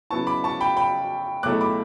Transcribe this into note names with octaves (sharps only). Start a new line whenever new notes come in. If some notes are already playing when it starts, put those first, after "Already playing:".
C#3 F#3 B3 E4 A5 C#6
B5 D6
A5 C#6
G5 B5
G5 B5
C#2 B2 F#3 A3 E4 D6 F#6
B5 D6